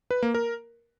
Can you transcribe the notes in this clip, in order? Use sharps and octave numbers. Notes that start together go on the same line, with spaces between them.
B4
A#3
A#4